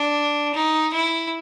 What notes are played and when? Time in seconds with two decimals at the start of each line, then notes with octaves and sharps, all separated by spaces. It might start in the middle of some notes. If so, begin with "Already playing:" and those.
Already playing: D4
0.54 D#4
0.93 E4